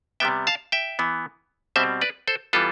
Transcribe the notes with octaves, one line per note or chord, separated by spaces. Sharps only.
C3 G3 B3 E5 G5
F5 A5
E5 G5
E3 B3
B2 G3 C4 C5 E5
B4 D5
A4 C5
E3 G3 B3 F4 A4